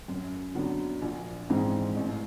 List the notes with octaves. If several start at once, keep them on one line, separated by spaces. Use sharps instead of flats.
F#2
D3 F#3 B3 D4
A#1
G#2 E3 G#3 C4
A1